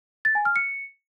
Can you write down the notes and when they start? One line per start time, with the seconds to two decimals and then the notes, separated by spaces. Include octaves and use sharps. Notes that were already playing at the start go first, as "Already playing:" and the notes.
0.25 A6
0.35 G#5
0.45 F6
0.56 C#7